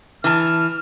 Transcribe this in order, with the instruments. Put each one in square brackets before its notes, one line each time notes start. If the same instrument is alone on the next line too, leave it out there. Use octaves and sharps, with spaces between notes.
[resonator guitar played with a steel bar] E3 A5 [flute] F6